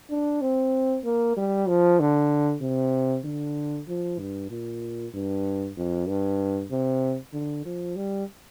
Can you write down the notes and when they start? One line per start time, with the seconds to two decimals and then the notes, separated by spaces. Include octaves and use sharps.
0.10 D4
0.41 C4
1.04 A#3
1.37 G3
1.68 F3
1.99 D3
2.61 C3
3.25 D3
3.88 F3
4.19 G2
4.50 A#2
5.14 G2
5.76 F2
6.08 G2
6.71 C3
7.33 D3
7.65 F3
7.96 G3